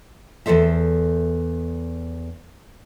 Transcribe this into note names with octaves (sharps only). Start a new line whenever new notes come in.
E2 G2 A4 C5 E5